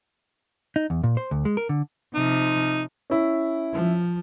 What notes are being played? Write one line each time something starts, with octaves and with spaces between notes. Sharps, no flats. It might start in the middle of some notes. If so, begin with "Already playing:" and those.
D#4
E2
A#2
C5
D2
G#3
A#4
D3
C3 F3 D#4
C#4 E4
F3